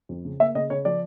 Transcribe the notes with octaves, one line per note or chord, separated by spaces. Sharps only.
F2
C#3
A#3 E5
C#3 D#5
C#3 C#5
F3 D5